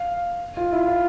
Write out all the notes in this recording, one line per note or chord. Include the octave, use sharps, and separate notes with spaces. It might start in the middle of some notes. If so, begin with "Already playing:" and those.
Already playing: F5
F4
E4
F4